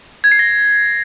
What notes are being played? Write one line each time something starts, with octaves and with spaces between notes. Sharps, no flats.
G#6
C7
A#6
C7